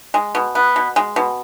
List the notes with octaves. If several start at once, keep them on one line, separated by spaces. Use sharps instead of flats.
G#3
B2
B3
B2
G#3
B2